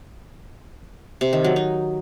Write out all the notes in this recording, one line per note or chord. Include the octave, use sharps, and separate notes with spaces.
C3
D#3
F#3
D#4